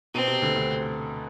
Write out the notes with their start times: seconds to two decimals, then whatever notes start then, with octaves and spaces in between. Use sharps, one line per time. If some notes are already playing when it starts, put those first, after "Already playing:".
0.14 B2 C4
0.28 C3
0.42 D2 D3
0.55 D2 D3